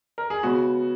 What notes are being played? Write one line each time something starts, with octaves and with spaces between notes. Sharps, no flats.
A#4
G#4
C#3 G#3 B3 F#4